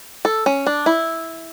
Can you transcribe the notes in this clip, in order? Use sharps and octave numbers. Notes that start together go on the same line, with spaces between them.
A4
C#4
D4
E4